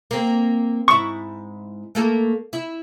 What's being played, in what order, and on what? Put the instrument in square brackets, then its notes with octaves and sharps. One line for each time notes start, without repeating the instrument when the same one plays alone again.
[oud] A#3 C4
[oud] G#2 E4 [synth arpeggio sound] C#6
[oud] A3 A#3 A4
E4